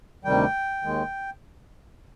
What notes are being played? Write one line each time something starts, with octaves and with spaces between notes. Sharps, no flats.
D2 C3 D#3 G3 G5
D#2 D#3 G#3